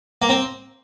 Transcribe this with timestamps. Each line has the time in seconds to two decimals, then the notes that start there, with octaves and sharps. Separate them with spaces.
0.22 A#3
0.29 C4